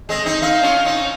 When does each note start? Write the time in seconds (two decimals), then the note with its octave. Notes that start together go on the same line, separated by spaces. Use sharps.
0.09 G#3 C4 D#5
0.26 C4 D#4
0.42 C4 D#4 F5
0.63 C#4 F4
0.85 C4 D#4